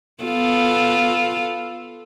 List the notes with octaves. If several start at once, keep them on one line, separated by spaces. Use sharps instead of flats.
B3 F4 A4